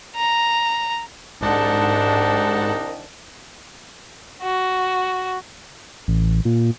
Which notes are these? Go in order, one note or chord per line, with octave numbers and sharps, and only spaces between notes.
A#5
C2 G#2 D#3 D4 D#4 F#5 A5
F#4
A1
A#2